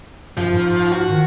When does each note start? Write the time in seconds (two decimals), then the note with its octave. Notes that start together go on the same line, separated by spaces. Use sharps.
0.37 F#2 F3
0.54 G#2
0.92 F#4
1.10 D#3